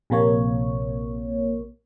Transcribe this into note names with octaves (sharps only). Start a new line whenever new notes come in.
A#1 C3 A#3 C#5